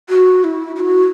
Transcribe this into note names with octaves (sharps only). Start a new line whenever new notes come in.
F#4
E4
E4
F#4